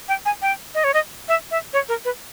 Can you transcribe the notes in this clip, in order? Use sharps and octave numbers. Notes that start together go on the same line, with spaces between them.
G5
G#5
G5
D#5
C#5
D#5
E5
E5
C#5
A#4
B4